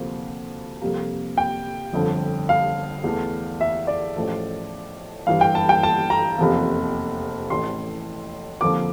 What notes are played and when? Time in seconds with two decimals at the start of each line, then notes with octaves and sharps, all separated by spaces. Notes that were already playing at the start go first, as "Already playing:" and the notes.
Already playing: D2 C3 F3 A#3
0.82 F2 C3 G3 A#3
1.38 G5
1.93 G1 F2 D3 F3
2.49 F5
3.04 E2 E3 A3
3.61 E5
3.87 D5
4.16 A1 A2 F3 A3
5.27 G1 G2 E3 F5
5.41 G5
5.55 A5
5.69 G5
5.83 A5
6.10 A#5
6.38 F1 E2 C3 F3 A#3
7.50 A1 A2 E3 A3 C6
8.61 F2 D3 F3 A#3 D6